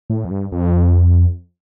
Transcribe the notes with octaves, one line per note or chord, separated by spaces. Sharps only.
A2
F2
G2
F2